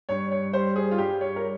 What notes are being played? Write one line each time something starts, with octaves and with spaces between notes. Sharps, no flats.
G2 C#5
C#5
G3 C5
G#4
F4
G2 G4
C#5
A#4